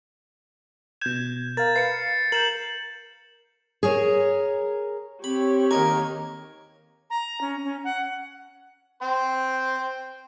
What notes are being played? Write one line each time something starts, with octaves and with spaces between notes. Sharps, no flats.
B2 G6 G#6 E7
A#4 F5 A6
B4 F5 C7 C#7
A#4 G6 E7 F#7
G#4 A#4 C#5
C4 G4 C#5 B5
D#2 A#4 D#5 G#5
A#5
C#4
C#4
F#5
C5 G5